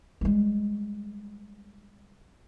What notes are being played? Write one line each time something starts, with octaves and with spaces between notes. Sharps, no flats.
G3 G#3